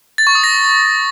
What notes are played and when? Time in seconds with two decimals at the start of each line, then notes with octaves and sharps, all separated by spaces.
0.18 A6
0.27 C#6
0.35 D#6
0.44 A#6